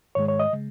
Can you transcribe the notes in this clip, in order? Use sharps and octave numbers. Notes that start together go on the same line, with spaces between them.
G#2 D#3 G#3 C#5
C#5
D#5
C#3 G#3